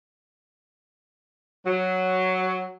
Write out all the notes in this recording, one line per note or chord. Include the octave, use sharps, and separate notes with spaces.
F#3